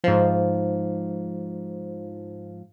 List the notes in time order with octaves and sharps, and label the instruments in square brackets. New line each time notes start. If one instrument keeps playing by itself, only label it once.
[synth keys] G#2 F3